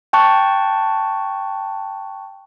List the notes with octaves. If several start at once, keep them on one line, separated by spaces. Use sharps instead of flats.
G5 A5 C#6 F#6